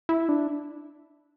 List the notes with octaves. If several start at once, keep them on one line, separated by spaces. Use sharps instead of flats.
E4
D4